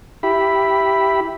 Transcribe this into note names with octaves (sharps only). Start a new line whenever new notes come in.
E4 G4 B5